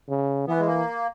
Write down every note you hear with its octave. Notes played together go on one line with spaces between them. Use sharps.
C#3
E3 B3
G#3
A#3